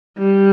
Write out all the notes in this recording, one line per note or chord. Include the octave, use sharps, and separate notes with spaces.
G3